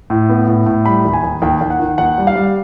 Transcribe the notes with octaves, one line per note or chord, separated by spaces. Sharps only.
A2
B3
A2
A2
G3 B5
D#2
G#5
D#2
D#2 G5
D#2
F#5
D#3
D#2 F#5
G3
F5
G3